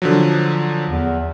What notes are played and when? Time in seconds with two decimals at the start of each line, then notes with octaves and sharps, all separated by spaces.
0.02 D3 F3 F#3
0.89 E2